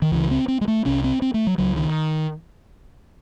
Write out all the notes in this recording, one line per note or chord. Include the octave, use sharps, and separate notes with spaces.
D#3
C#2 C#3 E3
C4
C4
G#3
A3
C2 C3 C#4
C4
C4
A3
F#3
C#2 C#3 F#3
D#3